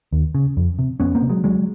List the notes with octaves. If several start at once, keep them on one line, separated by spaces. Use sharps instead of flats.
D#2
C#3
F2
C3
F2 B3 C#4
A#3 C4
C3
F#3 G#3
D2 F#3 G#3